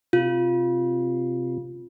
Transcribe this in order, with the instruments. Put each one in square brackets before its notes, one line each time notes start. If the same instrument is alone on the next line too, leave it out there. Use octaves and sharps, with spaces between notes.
[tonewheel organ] C3 [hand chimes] F4